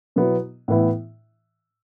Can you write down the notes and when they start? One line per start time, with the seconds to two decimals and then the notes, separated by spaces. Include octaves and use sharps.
0.16 B2 F#3 B3 E4
0.68 A2 E3 B3 E4